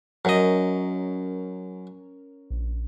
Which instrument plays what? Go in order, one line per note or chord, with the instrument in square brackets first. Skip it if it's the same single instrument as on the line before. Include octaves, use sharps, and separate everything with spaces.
[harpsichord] F#2 D#5 [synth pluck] C#4 A#4 C#5
[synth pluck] A#1